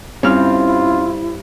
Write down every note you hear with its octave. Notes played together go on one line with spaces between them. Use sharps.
G2 C4 C#4 E4 F4 F6